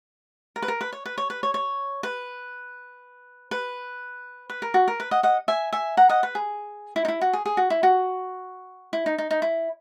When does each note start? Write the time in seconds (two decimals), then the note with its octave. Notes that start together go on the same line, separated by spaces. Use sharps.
0.56 A#4
0.62 B4
0.68 A#4
0.81 B4
0.93 C#5
1.06 B4
1.18 C#5
1.30 B4
1.43 C#5
1.54 C#5
2.03 B4
3.51 B4
4.50 B4
4.62 A#4
4.74 F#4
4.88 A#4
5.00 B4
5.11 D#5 F#5
5.23 D#5 F#5
5.48 E5 G#5
5.73 E5 G#5
5.97 F#5 A#5
6.09 D#5 F#5
6.23 B4
6.35 G#4
6.96 E4
7.05 D#4
7.08 E4
7.21 F#4
7.33 G#4
7.46 G#4
7.57 F#4
7.70 E4
7.83 F#4
8.93 E4
9.06 D#4
9.18 D#4
9.31 D#4
9.42 E4